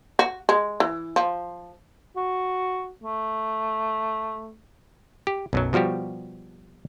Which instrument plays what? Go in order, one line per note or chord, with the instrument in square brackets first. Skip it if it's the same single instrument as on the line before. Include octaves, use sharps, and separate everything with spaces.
[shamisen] F#4
G#3
E3
F3
[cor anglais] F#4
A3
[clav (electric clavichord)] G4
B1 F#2 F#3
B2 F3 G3 F#4 G4